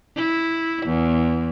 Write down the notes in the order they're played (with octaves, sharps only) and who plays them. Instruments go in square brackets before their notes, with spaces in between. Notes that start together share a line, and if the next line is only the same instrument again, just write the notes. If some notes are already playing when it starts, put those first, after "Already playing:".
[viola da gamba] E4
E2